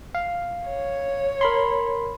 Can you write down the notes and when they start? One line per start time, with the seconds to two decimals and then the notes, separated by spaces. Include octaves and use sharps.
0.15 F5
0.68 C#5
1.41 A#4 B5 C6